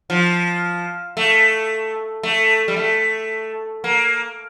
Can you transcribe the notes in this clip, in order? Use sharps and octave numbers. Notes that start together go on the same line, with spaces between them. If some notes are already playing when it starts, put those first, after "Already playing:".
F3
A3
A3
G3
A3
A#3